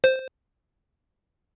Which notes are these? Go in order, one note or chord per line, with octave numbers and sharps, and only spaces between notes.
C5